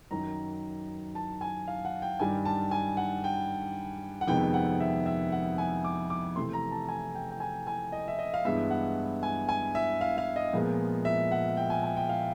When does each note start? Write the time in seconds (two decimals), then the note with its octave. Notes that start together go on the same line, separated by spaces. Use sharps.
0.11 F#2 D#3 F#3 A#5
1.15 A5
1.41 G#5
1.68 F5
1.85 F#5
2.02 G5
2.20 G2 D#3 G3 G#5
2.45 A5
2.71 G#5
2.97 F#5
3.24 G5
4.21 F#5
4.27 F2 C3 D#3 G#3 B3 G5
4.54 F#5
4.80 E5
5.06 E5
5.32 F#5
5.58 G#5
5.85 D6
6.10 D6
6.36 C3 E3 A3 C6
6.53 A#5
6.71 A5
6.88 G#5
7.15 G5
7.31 G5
7.40 G#5
7.67 G#5
7.92 D#5
8.08 E5
8.19 D#5
8.34 F5
8.45 G2 E3 G#3 B3 E5
8.70 F#5
9.23 G#5
9.49 G#5
9.75 E5
10.01 F5
10.18 F5
10.36 D#5
10.53 A#2 F3 G#3 B3
11.05 E5
11.31 F#5
11.57 G5
11.70 G#5
11.83 G#5
11.97 G5
12.09 F5